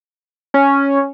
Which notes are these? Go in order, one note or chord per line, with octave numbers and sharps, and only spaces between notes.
C#4